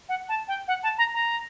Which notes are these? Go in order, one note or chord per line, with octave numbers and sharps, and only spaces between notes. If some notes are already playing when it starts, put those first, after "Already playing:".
F#5
A5
G5
F#5
A5
A#5
A#5